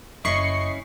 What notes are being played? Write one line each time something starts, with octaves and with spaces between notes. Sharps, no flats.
F#1 C#4 E4 D#5 C#6 C7